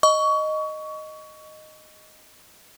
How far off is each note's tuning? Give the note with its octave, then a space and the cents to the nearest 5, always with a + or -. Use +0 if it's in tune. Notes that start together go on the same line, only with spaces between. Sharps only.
D#5 -5 C#6 +25